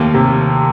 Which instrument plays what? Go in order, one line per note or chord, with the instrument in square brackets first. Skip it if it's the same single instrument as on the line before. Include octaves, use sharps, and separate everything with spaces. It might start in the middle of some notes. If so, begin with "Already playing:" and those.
Already playing: [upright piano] D#2 [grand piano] A3 A#3
[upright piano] C3